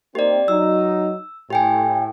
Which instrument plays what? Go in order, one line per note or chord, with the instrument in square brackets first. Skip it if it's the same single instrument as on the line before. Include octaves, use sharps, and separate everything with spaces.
[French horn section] A#3 C4 D#4 [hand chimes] G4 D5
[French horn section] F#3 D#4 [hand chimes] E6
[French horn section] A2 [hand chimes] G4 G5 G#5